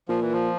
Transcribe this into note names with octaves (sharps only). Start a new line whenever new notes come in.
A#2 F3
E3
F3